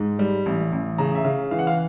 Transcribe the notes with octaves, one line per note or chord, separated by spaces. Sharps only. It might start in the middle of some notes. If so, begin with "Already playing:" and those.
Already playing: G#2
G3
A1
A1
C#3 A#5
E5
C#3 F5
E3 F5
F#5
F5